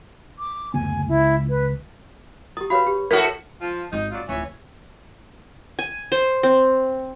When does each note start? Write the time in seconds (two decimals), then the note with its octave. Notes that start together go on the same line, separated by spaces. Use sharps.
0.39 D6
0.74 F#1 D2 B3 G#5
1.08 C#2 E4
1.49 B4
2.57 E4 G4 D#6
2.70 F#4 B4 C#5 F5 B5
2.87 G4
3.11 A2 F#4 A#4 F6 B6
3.61 F3 F4
3.93 G#1 G#2 D#4
4.11 F#3 F4 D5
4.29 D1 F2 E3 C#5
5.79 G#5
6.12 C5
6.43 C4